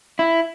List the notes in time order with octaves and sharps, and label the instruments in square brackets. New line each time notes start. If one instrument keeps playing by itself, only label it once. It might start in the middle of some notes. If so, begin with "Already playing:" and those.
[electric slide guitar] E4